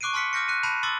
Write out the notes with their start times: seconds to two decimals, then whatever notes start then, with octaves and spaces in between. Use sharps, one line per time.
0.01 C#6 D6 F#6 C7 D7 D#7
0.13 A5 C6 F6 B6 C#7
0.33 D6 F6 G6 A#6 C#7
0.48 F#6 C#7 D#7
0.63 A5 B5 G6 C7 D#7 F7
0.83 C6 D6 E6 A6